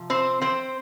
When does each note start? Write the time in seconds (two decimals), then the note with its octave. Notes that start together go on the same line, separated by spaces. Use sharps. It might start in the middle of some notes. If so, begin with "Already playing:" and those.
Already playing: C3 F3
0.10 C4 C5
0.41 C4 C5